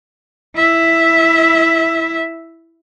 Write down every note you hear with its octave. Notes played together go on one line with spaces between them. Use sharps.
E4 E5